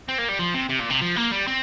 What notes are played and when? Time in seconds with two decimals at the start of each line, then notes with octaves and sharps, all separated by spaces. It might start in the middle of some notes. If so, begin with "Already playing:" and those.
0.08 C4
0.18 A#3
0.29 G3
0.39 F3
0.54 C3
0.70 C3
0.80 A#2
0.90 C3
1.02 F3
1.16 A#3
1.32 G3
1.47 C4